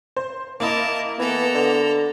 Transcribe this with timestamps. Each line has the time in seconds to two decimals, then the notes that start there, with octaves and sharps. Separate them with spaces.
0.17 C5
0.60 A#3 E4 A#4 D#5 A5
1.19 E3 B3 A4 A#5
1.54 D3